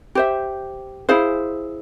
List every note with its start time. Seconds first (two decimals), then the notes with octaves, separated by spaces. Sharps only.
0.15 G4 C5 E5
1.09 E4 G#4 C5 F5